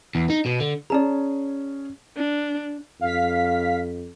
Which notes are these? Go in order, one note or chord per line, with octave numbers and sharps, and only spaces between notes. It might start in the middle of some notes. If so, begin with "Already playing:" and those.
E2
D#4
B2
D3
C#4 G#4 D5 A5 A#5
D4
F2 F5 B6